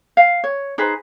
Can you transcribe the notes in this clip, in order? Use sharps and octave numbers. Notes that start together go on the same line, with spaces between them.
F5
C#5
D#4 G#4 B4 C5